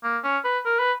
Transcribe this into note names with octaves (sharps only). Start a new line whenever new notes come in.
A#3
C#4
B4
A#4
B4